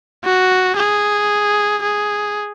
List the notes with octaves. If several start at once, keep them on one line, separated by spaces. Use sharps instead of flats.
F#4
G#4
G#4